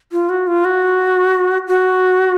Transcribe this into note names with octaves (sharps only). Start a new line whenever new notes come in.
F4
F#4
F4
F#4
F#4